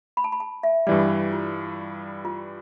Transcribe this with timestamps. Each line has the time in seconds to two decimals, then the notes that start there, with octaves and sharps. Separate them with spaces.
0.17 B5
0.24 A5
0.32 B5
0.40 A5
0.63 E5
0.87 G2 E3 G3 D5
1.32 F4
2.25 F4